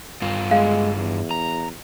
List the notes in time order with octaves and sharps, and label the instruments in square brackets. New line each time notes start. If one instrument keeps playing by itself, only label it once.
[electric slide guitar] G2 F4
[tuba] G#3 [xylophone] F5
[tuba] E2
[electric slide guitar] A#5